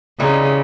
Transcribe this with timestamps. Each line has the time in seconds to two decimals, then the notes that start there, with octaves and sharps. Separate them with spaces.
0.20 C#3 E3 G3 C4 D#4